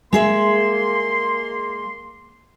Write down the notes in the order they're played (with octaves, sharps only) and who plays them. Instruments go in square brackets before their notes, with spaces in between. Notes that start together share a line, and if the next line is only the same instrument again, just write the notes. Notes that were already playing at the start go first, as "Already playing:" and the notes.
[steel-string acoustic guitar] G#3 G#4 E5 [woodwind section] A#3 C6